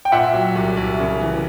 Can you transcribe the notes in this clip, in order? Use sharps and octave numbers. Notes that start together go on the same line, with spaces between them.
G5
A#2 E5 F#5
F#3
C2
C2
C#3
E3